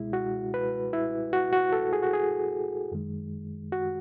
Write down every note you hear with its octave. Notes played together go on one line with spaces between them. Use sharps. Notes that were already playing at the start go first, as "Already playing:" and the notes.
Already playing: C#2 B2 G#3 E4
F#4
B4
E4
F#4
F#4
A4
G#4
F#4
G#4
F#2 D#3 G#3
F#4